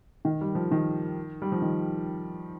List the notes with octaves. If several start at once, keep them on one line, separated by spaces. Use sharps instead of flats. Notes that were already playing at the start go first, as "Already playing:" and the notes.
D#3
G3
F3
D#3
G3
F3
D#3